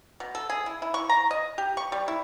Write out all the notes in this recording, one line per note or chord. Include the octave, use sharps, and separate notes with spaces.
B2
A4
G#4
E4
E4
C#6
A#5
D#5
G4
C#6
G3
E4